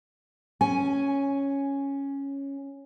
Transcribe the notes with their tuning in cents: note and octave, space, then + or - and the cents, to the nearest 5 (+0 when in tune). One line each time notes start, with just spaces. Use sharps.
C#4 +0 G#5 +0